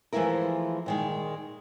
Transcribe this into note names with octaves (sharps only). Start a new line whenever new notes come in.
E3 F3 G#3 A3 E4 A#4
A#2 D#3 G#3